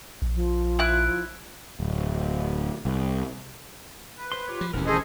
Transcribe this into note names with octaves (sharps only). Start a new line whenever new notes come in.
A#1
F3
E4 F#6
D1
C2
B4
C5 C6
F4 G4 C#5
F3
D#1 D2 C3 E3 C#4 E4 A#4
G#4 A4 C5 D#5